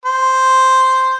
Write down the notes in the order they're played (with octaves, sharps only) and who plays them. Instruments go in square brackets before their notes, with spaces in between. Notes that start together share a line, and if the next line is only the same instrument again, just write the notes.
[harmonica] C5